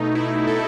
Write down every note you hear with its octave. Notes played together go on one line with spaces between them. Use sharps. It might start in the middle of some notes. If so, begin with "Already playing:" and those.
Already playing: B2 A3 D#4
E4
A4